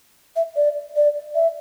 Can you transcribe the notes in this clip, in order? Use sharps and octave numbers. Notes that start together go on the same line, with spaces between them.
E5
D5
D5
E5